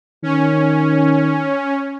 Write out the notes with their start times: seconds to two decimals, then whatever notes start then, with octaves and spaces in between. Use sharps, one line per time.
0.23 D#3 C#4